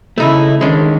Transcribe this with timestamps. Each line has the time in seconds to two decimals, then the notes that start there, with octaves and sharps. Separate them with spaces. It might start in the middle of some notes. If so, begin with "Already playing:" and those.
0.18 C#3 A3 D#4 E4
0.61 D#3 G#3 C#4 D4